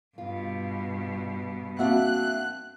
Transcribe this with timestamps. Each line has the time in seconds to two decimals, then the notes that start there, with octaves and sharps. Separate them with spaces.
0.18 G2 B2 F4
1.79 A#3 C4 D4 F#4 E5 F#5 F#6